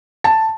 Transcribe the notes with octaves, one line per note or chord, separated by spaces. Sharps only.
A5